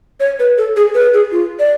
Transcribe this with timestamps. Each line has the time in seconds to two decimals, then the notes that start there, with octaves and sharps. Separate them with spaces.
0.20 C#5
0.39 B4
0.58 A4
0.76 G#4
0.94 B4
1.14 G#4
1.32 F4
1.60 D5